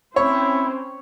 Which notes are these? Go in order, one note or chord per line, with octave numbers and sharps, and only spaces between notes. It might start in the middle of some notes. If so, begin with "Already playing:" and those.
C4 C#4 E4 C5 C#5